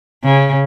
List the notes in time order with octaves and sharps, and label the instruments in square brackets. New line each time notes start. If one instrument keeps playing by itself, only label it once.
[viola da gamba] C#3